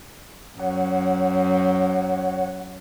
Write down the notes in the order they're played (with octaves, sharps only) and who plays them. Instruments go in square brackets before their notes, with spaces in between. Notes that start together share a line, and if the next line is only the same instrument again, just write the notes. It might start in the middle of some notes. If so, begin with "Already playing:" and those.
[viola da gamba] F#2 [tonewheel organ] C#5 F#5